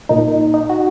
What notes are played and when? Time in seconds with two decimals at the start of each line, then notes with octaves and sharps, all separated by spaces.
0.09 A#2 D#4
0.54 D#4
0.69 F#4